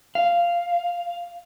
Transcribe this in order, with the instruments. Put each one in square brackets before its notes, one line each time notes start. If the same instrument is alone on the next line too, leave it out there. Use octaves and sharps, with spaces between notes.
[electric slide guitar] F5